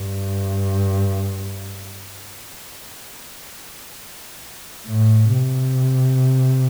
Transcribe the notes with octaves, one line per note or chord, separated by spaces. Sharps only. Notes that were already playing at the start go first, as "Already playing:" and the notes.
Already playing: G2
A2
C3